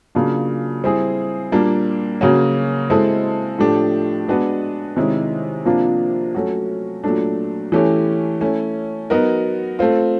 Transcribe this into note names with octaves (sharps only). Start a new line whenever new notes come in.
C#3 F#3 A#3 D4 F4
G3 C4 E4 G#4
A#2 G3 A#3 D4
C#3 F#3 A#3 C#4 F#4
G#3 C4 E4 A4
A2 F3 A3 D4 G4
G#3 B3 D4 F#4 B4
C3 D#3 G#3 C#4 E4
C3 F3 A#3 D4 F4
F#3 A3 C#4 F#4
A#2 F#3 A3 D4
E3 A3 C#4 E4 G4
A3 C#4 E4
F#3 B3 D#4 F#4 A#4
A3 C4 F4